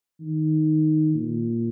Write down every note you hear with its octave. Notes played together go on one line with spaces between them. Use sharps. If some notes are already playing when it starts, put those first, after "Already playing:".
D#3
A#2